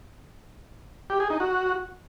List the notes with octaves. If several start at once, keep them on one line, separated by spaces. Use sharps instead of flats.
G4
G#4
D#4
F#4